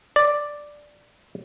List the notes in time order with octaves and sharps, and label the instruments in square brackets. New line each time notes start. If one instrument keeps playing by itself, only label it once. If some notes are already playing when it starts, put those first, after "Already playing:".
[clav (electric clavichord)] D5